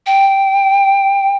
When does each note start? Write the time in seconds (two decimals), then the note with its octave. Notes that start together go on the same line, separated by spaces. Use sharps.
0.06 G5